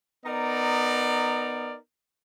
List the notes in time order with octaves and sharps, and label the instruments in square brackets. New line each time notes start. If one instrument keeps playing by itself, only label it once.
[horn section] B3 D#4 A#4 D5